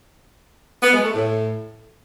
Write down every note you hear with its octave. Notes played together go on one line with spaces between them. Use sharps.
B3
G#3
A3
A2